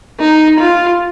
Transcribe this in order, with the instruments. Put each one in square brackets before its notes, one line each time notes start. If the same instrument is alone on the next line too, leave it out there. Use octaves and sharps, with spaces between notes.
[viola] D#4
F4